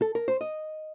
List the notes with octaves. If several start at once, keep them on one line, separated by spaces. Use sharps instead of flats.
A4
A#4
C5
D#5